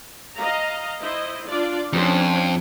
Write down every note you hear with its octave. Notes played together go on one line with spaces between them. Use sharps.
D#5 F5 A#5
E4 C5 D#5
D4 F4 D5
F2 C#4 D4 C5